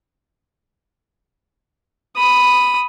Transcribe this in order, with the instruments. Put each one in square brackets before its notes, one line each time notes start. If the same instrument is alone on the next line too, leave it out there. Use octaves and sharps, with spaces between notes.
[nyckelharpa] B5 D#6